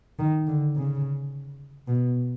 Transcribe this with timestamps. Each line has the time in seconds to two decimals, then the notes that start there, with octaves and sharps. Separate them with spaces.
0.19 D#3
0.47 D3
0.76 C#3
1.88 B2